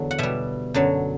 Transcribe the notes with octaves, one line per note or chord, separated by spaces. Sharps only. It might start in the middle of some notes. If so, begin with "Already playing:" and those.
Already playing: E2 D3 F#3
F#5
B2 G3 E5
F#2 D3 F#3